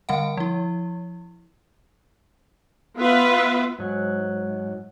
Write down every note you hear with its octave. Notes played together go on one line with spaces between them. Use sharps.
D3 G3 F5 F#5
F3 E4
B3 F4 B4 E5
G#2 F#3